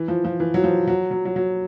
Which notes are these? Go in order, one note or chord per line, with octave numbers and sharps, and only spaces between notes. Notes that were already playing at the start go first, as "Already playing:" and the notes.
Already playing: E3
F3
F3
E3
F#3
F3
F#3
F#3
F#3
F#3